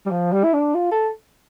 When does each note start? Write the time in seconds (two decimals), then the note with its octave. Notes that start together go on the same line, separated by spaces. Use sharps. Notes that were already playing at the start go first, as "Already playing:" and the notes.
0.06 G3
0.11 F3
0.32 G3
0.44 E4
0.54 D4
0.74 F4
0.91 A4